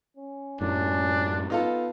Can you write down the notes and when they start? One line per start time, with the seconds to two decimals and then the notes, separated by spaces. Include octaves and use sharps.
0.17 C#4
0.61 F#2 A2 C#4 D4
1.50 B3 D#4 F4 A4